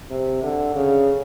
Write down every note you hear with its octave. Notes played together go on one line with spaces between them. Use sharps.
C3
D3
C#3